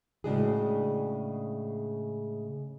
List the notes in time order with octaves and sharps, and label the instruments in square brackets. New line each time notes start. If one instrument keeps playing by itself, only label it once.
[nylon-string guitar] A2 C#3 G#3 D4 F#4 G#4